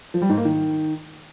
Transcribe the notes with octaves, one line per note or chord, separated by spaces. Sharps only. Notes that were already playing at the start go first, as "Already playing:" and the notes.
F3
G3
G#2
A#3
D#3